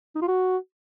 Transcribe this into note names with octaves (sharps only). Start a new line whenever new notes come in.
D#4
F4
F#4